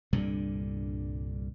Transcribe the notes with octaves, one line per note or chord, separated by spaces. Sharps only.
C2 G2 A#2 D3